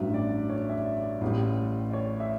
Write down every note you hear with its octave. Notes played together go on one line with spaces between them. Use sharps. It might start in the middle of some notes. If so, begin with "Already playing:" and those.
Already playing: A1 G2 F#3 E5
D5
C#5
E5
D5
D5
A1 A2 G3
D5
C#5
E5